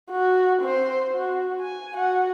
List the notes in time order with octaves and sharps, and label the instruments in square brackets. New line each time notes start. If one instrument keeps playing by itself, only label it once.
[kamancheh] F#4
C4 C5
F#4
G#5
F#4 F#5